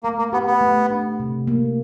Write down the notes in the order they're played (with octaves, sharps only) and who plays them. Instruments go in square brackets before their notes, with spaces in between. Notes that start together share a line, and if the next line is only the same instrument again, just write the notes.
[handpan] A3 [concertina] A#3
[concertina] A#3
[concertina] B3 [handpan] G4
[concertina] B3
[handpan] A3
D4
C3
A#3